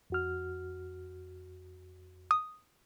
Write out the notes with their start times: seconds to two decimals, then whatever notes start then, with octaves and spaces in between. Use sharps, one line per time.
0.10 F2 F#4 F6
2.31 D#6